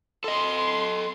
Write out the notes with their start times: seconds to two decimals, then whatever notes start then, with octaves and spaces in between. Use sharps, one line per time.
0.24 A4 D#5 C6